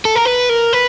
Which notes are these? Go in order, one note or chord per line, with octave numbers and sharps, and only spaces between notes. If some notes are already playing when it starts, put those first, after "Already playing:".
A4
A#4
B4
A#4
B4